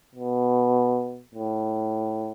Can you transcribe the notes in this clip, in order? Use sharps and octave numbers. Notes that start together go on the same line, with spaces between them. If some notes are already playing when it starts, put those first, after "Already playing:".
B2
A2